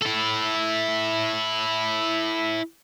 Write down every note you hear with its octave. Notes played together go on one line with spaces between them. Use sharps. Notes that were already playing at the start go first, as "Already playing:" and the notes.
E4 A4